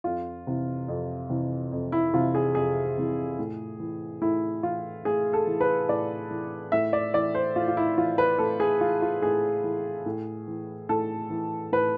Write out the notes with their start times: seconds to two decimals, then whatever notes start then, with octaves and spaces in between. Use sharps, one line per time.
0.04 F2 F4
0.47 C3 E3
0.88 F2
1.30 C3 E3
1.72 F2
1.92 E4
2.13 C3 E3 F4
2.35 G#4
2.55 F2 G#4
2.97 C3 E3
3.39 A2
3.80 E3
4.21 A2 E4
4.63 E3 F4
5.05 A2 G#4
5.33 A4
5.47 E3
5.61 B4
5.89 A2 D5
6.31 E3
6.72 A2 E5
6.93 D5
7.14 E3 D5
7.35 C5
7.56 A2 F4
7.68 F4
7.77 E4
7.98 E3 F4
8.18 B4
8.38 A2 A4
8.60 G#4
8.81 E3 F4
9.02 F4
9.22 A2 G#4
9.64 E3
10.06 A2
10.48 E3
10.89 A2 A4
11.30 E3
11.72 A2 B4